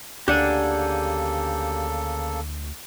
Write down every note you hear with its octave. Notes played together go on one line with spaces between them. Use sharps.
D2 C#3 A#3 D4 G4 A4 F#5 G#5